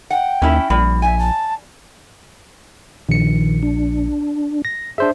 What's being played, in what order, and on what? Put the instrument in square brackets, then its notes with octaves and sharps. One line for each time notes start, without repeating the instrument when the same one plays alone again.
[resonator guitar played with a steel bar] F#5 [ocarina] G5
[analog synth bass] D#2 [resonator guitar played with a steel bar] C#4 E4
[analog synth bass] A#1 [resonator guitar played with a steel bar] G3
[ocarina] E5 [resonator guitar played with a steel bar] G#5
[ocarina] A5
[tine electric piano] A#1 C#7 [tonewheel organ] D#3
[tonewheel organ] D4
[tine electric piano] A#6
[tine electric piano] D4 C5 E5 [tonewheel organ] G#4